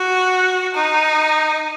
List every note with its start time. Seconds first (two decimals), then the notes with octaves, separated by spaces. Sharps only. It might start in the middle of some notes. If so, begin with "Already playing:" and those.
Already playing: F#4
0.75 D#4